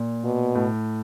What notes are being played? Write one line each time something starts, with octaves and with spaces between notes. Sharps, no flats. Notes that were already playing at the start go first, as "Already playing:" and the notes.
Already playing: A#2
B2
A2